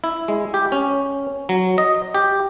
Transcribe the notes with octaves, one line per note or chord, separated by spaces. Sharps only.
E4
G#3
G4
C#4
F#3
D#5
G4